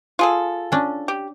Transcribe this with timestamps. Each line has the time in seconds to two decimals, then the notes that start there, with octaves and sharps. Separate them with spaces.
0.19 F4 G#4 A4
0.72 C#4 D4
1.08 G4